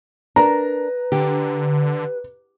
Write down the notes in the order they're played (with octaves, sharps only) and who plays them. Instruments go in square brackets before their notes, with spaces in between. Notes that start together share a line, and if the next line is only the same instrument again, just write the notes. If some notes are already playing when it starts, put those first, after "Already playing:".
[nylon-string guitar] D4 A#4 [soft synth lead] B4 [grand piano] A#5
[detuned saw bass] D3 [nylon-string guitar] G4